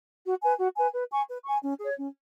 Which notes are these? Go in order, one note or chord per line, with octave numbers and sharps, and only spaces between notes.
F#4
B4 G#5
F#4
B4 G#5
B4
G#5 C#6
B4
G#5 C#6
C#4
G#4 C#5
C#4